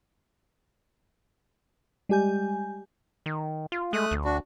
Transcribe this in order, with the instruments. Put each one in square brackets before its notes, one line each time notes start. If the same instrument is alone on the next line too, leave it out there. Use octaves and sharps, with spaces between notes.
[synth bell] G3 G#3 G4 G#5 G6
[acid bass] D#3
F4
[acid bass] G#3 [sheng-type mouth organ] A3 D#6 F#6
[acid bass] D2
[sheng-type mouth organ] D4 F#4